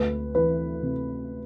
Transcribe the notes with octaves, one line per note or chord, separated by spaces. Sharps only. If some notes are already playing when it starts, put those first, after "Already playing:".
Already playing: D2 B4
E3 B4
C3